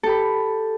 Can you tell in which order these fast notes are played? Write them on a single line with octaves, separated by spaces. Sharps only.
A4 G4 B5